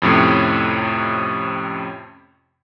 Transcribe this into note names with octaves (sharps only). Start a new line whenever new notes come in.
F2 A2 C3 C#4